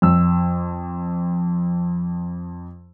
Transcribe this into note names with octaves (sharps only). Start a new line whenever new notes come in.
F2 E6